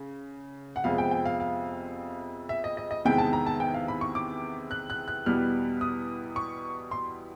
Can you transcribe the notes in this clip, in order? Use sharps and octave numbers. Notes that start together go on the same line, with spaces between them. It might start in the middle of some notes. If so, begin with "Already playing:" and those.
Already playing: C#3
F#5
F2 C3 F3 G#3 B3 F5
G5
G5
F5
F5
E5
D#5
D#5
D#5
E2 C3 D#3 G#3 B3 G5
A5
A#5
A5
G5
F5
B5
C#6
D6
F#6
F#6
F#6
E2 B2 G3 B3 F6
D#6
C#6
C6